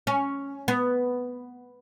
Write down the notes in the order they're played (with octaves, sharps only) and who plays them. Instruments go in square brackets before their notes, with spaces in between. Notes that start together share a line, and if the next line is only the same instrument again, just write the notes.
[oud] C#4
B3